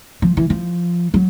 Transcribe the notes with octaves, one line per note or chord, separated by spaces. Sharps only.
F3
E3
F3
F#3